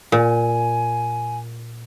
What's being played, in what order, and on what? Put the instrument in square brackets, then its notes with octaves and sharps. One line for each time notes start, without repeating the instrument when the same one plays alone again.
[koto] A#2 [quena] G#5